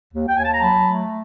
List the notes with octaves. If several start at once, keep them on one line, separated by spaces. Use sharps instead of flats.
D#2
G5
D#2 G#5
A5
A#5
F#3 A5 B5
A3